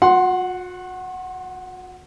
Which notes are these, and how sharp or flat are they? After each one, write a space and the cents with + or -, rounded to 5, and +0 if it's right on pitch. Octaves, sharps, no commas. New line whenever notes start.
F#4 -45 F#5 +0 C6 +10